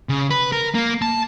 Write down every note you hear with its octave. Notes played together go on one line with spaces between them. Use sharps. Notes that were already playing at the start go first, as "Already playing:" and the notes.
C#3
B4
A#4
A#3
A5